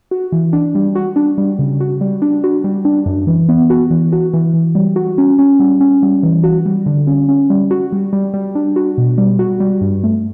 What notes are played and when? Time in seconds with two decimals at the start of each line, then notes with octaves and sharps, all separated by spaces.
0.11 F#4
0.32 E3
0.53 D4
0.75 G3
0.95 F#4
1.16 D4
1.38 G3
1.59 C#3
1.80 F#4
2.01 G3
2.22 D4
2.44 F#4
2.64 G3
2.85 D4
3.06 F#2
3.27 E3
3.49 B3
3.70 F#4
3.90 E3
4.12 F#4
4.34 E3
4.54 E3
4.75 G3
4.96 F#4
5.18 C#4
5.39 C#4
5.60 G3
5.81 C#4
6.03 G3
6.23 E3
6.44 F#4
6.66 G3
6.86 D3
7.07 C#4
7.29 C#4
7.50 G3
7.71 F#4
7.92 G3
8.13 G3
8.34 G3
8.55 D4
8.76 F#4
8.98 B2
9.18 G3
9.39 F#4
9.60 G3
9.81 G2
10.03 A3